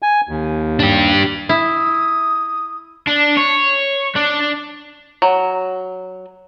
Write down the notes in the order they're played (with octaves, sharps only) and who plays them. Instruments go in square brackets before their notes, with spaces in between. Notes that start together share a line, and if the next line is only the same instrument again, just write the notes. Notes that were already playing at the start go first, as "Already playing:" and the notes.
[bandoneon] G#5
D#2
[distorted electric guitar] D4 G4
[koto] E4 [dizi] D#6
[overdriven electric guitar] D4
C#5
D4
[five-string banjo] F#3